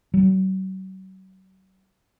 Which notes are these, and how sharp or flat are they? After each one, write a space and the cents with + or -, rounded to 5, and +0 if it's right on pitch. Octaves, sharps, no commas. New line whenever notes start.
F#3 +40